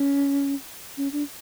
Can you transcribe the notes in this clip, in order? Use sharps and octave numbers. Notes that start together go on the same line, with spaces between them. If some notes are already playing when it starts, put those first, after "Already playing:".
Already playing: C#4
C#4
D4